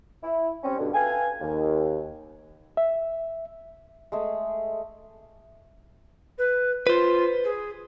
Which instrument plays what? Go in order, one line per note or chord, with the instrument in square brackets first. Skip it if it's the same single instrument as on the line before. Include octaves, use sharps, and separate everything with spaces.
[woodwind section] E4
G3 C4 C#4
G2 B2 D3
A4 B4 F5 G5 G#5
D#2
[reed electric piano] E5
[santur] G#3 A3 G#4 E5
[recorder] B4
[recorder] F4 [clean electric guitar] B4 C5
[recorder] G#4